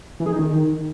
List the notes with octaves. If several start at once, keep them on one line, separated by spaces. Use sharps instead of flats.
E3
G#4
D#4
D#3